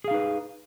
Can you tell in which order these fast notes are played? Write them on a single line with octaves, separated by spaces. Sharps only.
G#4 F5 D#4 B4